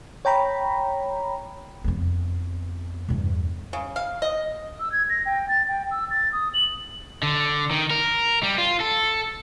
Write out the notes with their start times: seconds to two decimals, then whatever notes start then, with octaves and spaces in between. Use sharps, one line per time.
0.25 C#5 G5 A#5 B5
1.84 F2 B3
3.09 E2 G2
3.73 C#3
3.96 F5
4.22 D#5
4.80 E6
4.92 G#6
5.09 A#6
5.26 G5
5.49 A6
5.68 G5
5.91 E6
6.11 A6
6.32 D#6
6.54 F#7
7.23 D3
7.71 D#3
7.91 A#4
8.43 G3
8.58 F4
8.80 A4